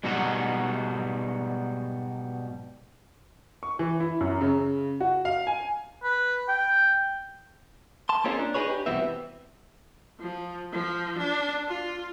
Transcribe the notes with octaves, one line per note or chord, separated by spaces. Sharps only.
G#2 B2 F#3 G3 D#4 F#4
C#6
E3
E4
F#2
C#3
F#4
F5
G#5
B4
G5
A5 C6
A#3 C4 C#4 D#4 F4 G#4
D4
D4 D#4 F#4 G#4 B4 C#5
G4
C2 B2 E3 B3 C4 E5
F3
F3
D4
F4